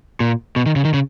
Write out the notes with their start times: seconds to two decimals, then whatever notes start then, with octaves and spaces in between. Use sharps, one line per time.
0.20 A#2
0.56 B2
0.66 D#3
0.76 C#3
0.85 D#3
0.94 C#3